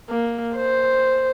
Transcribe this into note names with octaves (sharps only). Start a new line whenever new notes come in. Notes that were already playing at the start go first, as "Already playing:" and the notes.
A#3
C5